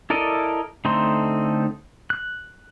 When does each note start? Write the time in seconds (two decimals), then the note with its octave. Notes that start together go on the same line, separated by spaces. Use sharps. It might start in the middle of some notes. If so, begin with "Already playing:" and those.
0.10 E4 A4 A#4 D5 D#5
0.85 D3 A3 C4 D#4 C6
2.10 F#6